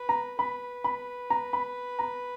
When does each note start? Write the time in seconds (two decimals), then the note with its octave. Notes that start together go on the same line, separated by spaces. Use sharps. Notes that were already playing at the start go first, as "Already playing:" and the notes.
Already playing: B4
0.09 A#5
0.39 B4 B5
0.84 B5
1.30 A#5
1.53 B5
1.99 A#5